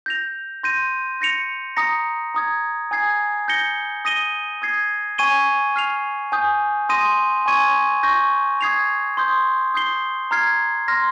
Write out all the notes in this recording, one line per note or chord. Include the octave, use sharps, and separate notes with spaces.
G6 A#6 F7
C6 G6 A#6 D#7
G6 A#6 C#7 F7
A#5 D#6 A#6 C#7
A#5 D#6 G#6
G#5 D#6 G#6 C7
G6 A#6 C#7 G7
D#6 A#6 D#7 G7
D#6 G#6 C7
G#5 C#6 G#6 D#7 G7
F6 C7 F7
G#5 D#6 G6
C6 D#6 A#6 D#7
G#5 C#6 G#6 D#7
C#6 G6 A#6
D#6 G#6 C7 F7
C6 D#6 G6
D#6 G6 C7 G7
A#5 F6 G#6 C7
C6 F6 A#6